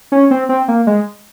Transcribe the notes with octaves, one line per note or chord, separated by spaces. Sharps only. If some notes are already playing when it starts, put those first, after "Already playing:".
C#4
C4
C4
A#3
G#3